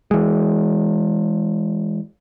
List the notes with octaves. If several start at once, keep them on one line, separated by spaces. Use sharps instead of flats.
E3 G#3